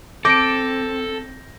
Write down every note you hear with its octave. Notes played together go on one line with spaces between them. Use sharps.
C4 A4 D6 G6 A#6 D7